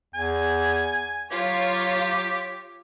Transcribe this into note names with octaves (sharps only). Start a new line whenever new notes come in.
E2 G#5
F#3 F4 G4 C#5